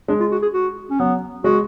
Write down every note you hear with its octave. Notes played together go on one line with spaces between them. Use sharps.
G#3 D4
F4
F#4
G#4
F#4
C#4
F#3 B3
G#3 F#4